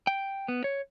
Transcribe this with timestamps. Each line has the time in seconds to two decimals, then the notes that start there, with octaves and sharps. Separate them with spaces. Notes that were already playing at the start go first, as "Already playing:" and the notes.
0.07 G5
0.48 B3
0.64 C#5